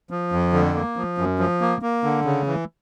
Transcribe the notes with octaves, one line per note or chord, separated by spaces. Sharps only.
F3
F2
D3
A#3
F3
F#2
F3
A#3
A#3
D3
C#3
E3